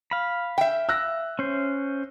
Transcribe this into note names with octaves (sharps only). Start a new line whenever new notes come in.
F5 B5
E5 G5
E6 F#6 A#6
C#4 C5